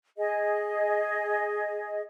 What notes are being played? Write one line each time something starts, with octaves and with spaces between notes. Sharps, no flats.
G#4 D#5